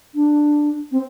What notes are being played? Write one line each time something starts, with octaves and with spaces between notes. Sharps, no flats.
D4
C4